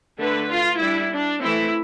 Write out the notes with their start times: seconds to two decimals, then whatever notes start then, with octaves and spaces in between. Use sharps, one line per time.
0.18 D3 A3 D4 B4
0.49 F4
0.79 G3 D4 E4
1.10 D4
1.41 E3 A3 C4 E4